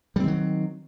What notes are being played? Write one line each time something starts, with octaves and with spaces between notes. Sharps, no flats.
D#3 F#3 G3 C4